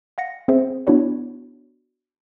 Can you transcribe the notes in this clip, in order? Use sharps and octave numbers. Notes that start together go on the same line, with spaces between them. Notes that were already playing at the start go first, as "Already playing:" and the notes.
F5 F#5 A#6 C#7
C4 G#4 C5 E5
B3 D4 E4 F#4 C#5 D5